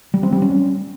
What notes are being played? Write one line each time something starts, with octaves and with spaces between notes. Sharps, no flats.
G3
C4
G3
C#4